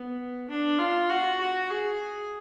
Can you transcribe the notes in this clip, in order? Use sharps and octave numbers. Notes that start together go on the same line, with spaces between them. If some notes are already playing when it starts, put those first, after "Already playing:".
Already playing: B3
D4
F4
F#4
F#4
G#4